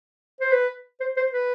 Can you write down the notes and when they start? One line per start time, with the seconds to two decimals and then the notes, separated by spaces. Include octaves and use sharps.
0.41 C5
0.52 B4
1.00 C5
1.17 C5
1.33 B4